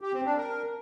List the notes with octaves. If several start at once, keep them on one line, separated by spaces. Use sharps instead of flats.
G4
C4
D4
A#4